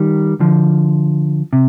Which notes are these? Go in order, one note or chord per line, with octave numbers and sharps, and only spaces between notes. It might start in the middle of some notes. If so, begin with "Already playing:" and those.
Already playing: D#3 G3
D3 F3
C3